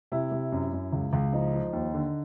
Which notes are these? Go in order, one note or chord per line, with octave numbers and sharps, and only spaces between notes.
C3 E4
C3
F#2
F#2
C#2
C#2
F3 D#4
F3
D#2
D3